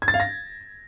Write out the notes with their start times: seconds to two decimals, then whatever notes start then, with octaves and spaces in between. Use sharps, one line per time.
0.02 G#6
0.08 A6
0.14 F5
0.20 A#6